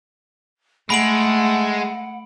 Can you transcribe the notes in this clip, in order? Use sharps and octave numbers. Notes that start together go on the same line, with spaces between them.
G#3 A3 F#5 B5 D7 F#7